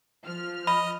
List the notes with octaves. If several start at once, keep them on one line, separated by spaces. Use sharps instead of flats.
F3 F6
D#5 B5